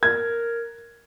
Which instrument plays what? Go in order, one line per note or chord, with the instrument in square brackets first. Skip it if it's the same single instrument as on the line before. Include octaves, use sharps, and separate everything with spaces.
[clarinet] A#4 [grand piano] G#6